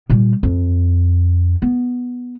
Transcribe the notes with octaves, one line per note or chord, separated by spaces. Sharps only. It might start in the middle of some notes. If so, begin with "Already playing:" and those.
A#2 G3
F2
B3